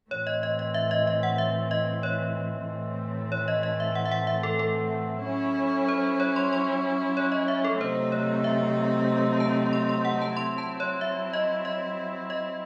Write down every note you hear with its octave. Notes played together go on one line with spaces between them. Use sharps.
A2 E3 C4 C#5
D#5
D#5
D#5
E5
D#5
D#5
F#5
E5
D#5
C#5
A2 E3 A3 C4
C#5
D#5
D#5
E5
F#5
E5
F#5
E5
A4
A4
F#3 C#4 E4
C5
C#5
C6
C6
C#5
D#5
E5
A4
C3 F#3 A3 C4 D#4 C5
C#5
E5
A5
C6
C6
F#5
A5
F#3 C4 E4 C6
A5
C#5
E5
D#5
D#5
D#5